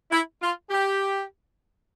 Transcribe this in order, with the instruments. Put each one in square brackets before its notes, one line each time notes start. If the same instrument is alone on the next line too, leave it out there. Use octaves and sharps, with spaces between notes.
[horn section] E4
F4
G4